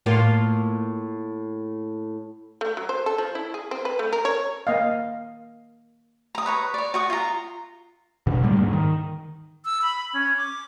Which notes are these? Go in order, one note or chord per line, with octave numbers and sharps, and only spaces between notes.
A2 A#3 F4
A3
F#3
C5
A4
F3
E4
G#4
C4
B4
A3
A#4
C#5
A#3 D#5 F5
A#5 D#6
B4 C#5 A#5
C#5 D5
F#4 C#6 D#6
F4 A#5
B2 D3
A2 G3 A3 A#3
D2 G#2
D#3
E6
B5
C#4
D6